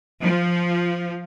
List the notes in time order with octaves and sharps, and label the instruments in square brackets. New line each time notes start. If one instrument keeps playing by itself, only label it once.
[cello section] F3